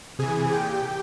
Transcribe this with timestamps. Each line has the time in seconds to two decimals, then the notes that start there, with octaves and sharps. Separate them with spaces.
0.19 C3 E3 G#4 G#5
0.52 A#2 G4 G5